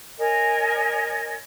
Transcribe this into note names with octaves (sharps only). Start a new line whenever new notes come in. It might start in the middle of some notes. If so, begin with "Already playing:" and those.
A#4 C#5 D#5 G#5